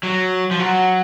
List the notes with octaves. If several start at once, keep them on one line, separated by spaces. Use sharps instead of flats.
F#3
F3
F#3